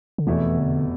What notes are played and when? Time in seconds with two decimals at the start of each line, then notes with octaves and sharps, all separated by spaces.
0.18 D3
0.27 F1 E2 B2 E3 A3 E4
0.59 D3